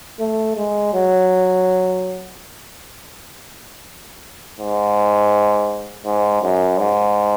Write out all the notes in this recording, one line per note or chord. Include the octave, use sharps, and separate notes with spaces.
A3
G#3
F#3
G#2
G#2
F#2
G#2